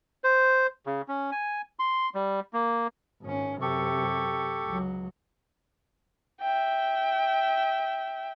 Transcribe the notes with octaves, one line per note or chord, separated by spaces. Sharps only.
C5
C#3
C#4
G#5
C6
G3
A#3
G#1 C#4
F#2 C3 G4 A4 C#6
C#2 F#3
E5 G5